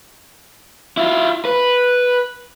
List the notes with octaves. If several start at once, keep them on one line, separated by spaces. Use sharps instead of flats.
E4 F4
B4